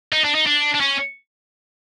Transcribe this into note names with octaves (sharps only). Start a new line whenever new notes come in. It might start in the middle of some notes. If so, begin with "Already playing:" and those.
D#4
D4
D#4
D4
D4
C#4